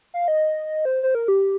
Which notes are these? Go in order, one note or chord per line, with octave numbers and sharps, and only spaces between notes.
F5
D#5
C5
C5
A#4
G4